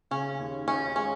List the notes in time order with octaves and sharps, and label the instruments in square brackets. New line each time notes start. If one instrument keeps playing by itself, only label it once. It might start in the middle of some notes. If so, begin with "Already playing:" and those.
[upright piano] C#3 [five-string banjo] C#4
[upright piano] D#2
[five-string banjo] C#4 [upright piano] D#4
[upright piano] G#3 [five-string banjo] C#4